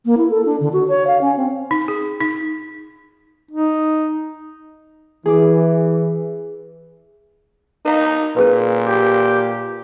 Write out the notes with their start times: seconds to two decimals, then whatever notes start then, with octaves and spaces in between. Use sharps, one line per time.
0.05 A#3
0.17 E4
0.30 A4
0.45 D4
0.60 D3
0.73 F#4
0.88 C#5
1.07 F5
1.21 C#4
1.37 C4
1.71 D#4
1.88 G#4
2.21 D#4
3.51 D#4
5.26 E3 G#4 D6
7.85 D#4 A#4 F5 A#5
8.36 A#2 C#4 G#4 B4
8.86 G4